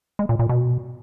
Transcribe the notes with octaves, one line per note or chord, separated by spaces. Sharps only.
G#3
A#2
A#2
B2